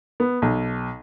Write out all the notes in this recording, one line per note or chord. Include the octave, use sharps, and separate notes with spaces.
B3
B1